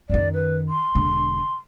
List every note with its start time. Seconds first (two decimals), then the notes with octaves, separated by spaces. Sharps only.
0.10 F#2 D#3 D5
0.34 B4
0.69 C6
0.95 E1 D3